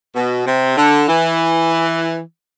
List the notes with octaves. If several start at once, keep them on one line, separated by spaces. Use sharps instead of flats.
B2
C3
D3
E3